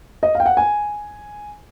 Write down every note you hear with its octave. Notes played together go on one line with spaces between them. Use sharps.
D#5
F5 G5
F#5
G#5